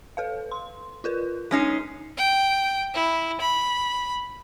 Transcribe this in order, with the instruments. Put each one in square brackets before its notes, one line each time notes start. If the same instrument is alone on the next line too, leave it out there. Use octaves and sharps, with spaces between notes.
[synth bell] A4 B4 F5
C6
F4 A#4 B4
[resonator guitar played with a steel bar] G#3 C#4 D#4 [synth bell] B6 C7
[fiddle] G5
E4
B5